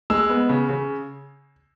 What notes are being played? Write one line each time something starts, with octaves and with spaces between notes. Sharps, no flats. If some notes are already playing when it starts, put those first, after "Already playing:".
G#3 E6
B3
C#3
C#3